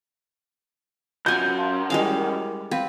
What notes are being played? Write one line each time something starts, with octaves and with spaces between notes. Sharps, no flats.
F#2 F4 F#5 G#5 G6
F5 A5 C6
G3 G#3 E4 A#4 D#5 F5
C4 B4 F5